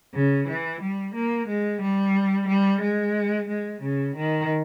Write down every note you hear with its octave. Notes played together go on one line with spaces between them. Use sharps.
C#3
E3
G3
A#3
G#3
G3
G3
G#3
G#3
C#3
D#3